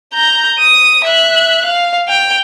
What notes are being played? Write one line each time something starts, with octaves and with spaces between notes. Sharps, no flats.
A#5 G6
D#6 D#7
E5 F#6
F5
G5 F7